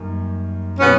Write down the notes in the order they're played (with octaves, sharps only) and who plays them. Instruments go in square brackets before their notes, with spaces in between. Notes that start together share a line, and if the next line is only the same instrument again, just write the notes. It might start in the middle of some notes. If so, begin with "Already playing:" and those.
Already playing: [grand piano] F#2 D#3 G3 A#3
[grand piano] B2 F#3 A#3 D#4 G4 [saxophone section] B3 C#4